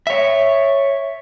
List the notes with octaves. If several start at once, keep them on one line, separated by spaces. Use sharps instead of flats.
C#5 E5